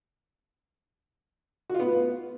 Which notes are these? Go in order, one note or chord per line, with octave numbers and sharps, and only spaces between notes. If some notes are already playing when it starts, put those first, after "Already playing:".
F#4
F4
B3